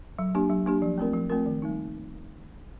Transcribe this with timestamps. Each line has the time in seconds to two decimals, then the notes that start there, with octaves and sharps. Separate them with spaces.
0.19 F#3
0.35 A#3 D4 G4
0.50 F#3
0.66 A#3 D4 G4
0.82 F3
0.98 A3 C4 F4 A#4
1.14 F3
1.30 A3 C4 F4 A#4
1.46 D#3
1.62 G3 A#3 D#4